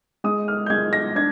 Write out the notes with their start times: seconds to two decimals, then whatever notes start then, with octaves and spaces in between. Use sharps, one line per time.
0.24 G#3 D#6
0.48 F6
0.66 G6
0.70 G#3 G#6
0.93 A#6
1.16 D4 G#6